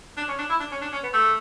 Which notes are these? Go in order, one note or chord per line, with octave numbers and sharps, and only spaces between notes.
D4
C#4
D4
E4
D4
C#4
D4
C#4
B3
A3